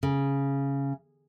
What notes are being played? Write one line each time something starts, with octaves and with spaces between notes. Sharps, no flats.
C#3